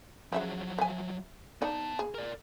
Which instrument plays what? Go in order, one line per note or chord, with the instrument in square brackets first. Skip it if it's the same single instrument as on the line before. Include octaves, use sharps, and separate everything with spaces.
[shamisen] C#3 E5 F#5 [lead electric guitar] F3 F#3
[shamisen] E5 G#5
[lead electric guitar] B3 A5 [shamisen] D#4 D5
[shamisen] G#4
[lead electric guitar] A#4 D5